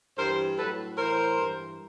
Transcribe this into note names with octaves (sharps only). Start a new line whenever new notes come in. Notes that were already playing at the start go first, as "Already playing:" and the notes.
G2 E3 A#4 C5
A2 F#3 A4 B4
A2 E3 A#4 C5
G2 E3